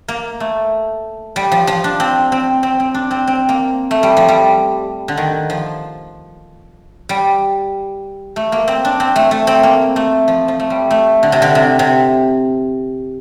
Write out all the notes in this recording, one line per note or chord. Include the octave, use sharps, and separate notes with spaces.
A#3
A3
G3
F3
F3
D4
C4
C4
C4
C4
D4
C4
C4
A#3
A3
G3
F3
G3
D3
D#3
F3
G3
A3
A#3
C4
D4
C4
A3
A3
C4
A#3
A3
F3
F3
A3
G3
A3
D3
C3
D3
C3
C3